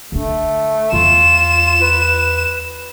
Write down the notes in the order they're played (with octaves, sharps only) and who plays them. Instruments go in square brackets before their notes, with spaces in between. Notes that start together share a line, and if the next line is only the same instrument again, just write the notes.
[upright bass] D3 D4 [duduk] A3
[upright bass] E2 [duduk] F4 [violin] E7
[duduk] B4